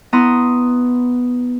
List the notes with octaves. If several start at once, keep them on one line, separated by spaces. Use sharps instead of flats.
B3 E4 A#5 C6 D#6